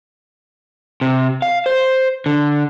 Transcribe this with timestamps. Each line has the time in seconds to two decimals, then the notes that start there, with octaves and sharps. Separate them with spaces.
1.01 C3
1.42 F5
1.66 C5
2.26 D3